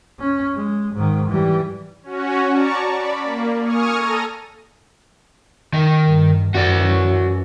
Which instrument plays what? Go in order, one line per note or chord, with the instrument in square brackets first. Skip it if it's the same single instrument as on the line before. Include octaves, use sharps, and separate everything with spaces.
[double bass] C#4
G#3
G#2 D#3
E3 G3
[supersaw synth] C#4 F#4
D5 A5 A#5 C#6
D5 B5
A#3
G#5 C#6 D#6 F6
A4 A#5 A#6 D#7
[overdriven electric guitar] D#3
[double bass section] G2
[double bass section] F#2 E3 C#4 [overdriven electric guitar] F#4 D5